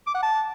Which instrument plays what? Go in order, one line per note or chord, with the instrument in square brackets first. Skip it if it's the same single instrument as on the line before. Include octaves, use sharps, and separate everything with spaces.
[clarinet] D6
F#5
A5